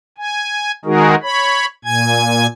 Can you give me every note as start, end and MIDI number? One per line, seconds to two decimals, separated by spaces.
0.18 0.71 80
0.85 1.15 51
0.85 1.15 56
0.85 1.15 63
0.85 1.15 66
0.85 1.15 68
0.85 1.15 70
1.23 1.66 73
1.23 1.66 83
1.85 2.47 46
1.85 2.47 80
1.85 2.47 92